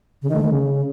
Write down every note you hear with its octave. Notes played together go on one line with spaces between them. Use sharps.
C#3
D#3
A3
D#3
C#3